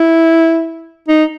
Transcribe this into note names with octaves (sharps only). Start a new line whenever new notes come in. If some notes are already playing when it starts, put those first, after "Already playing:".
Already playing: E4
D#4